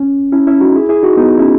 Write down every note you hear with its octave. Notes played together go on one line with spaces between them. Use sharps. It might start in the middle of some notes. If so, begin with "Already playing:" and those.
Already playing: C#4
C#4 E4
C#4 E4
D#4 F#4
E4 G#4
E4 G#4
D#4 F#4
B3 D#4
C#4 E4